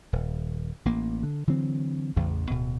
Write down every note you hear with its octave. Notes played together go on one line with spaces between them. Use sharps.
D#1
A1 A#3
D3
D3 E3 F#3 C4
A1 E2 C#3
D1 B2